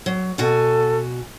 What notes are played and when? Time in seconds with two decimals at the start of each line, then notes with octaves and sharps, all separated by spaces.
0.06 F#3
0.38 B2 F#4 A4 G#5